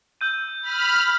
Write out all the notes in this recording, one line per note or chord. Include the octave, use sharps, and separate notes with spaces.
E6 G6 D#7
B5 F6